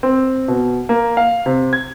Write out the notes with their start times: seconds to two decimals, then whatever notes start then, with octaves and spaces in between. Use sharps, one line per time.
0.03 C4
0.48 B2
0.89 A#3
1.17 F5
1.46 C3
1.73 G#6